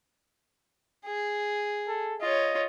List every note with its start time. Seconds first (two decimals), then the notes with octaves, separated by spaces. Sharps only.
1.06 G#4
1.88 A4
2.21 F4 C#5 D#5